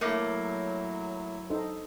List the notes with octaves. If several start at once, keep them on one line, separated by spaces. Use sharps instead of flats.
F#3 A3 A#3 E4
D#4 A4 C5